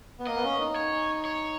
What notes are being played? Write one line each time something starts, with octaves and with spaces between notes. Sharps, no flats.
B3
A#3 D#5
B3
C#4
D#4
C#5
C#5